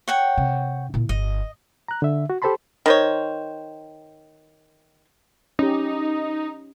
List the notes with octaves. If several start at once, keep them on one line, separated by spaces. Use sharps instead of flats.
C#5 F#5 G5
C3
A#2 E4
G1 D#5
A#5 F#6
D3 E5
F#4
G4 A4 C5 A5 B5 C6
D#3 C5 C#5
C#4 D#4 G4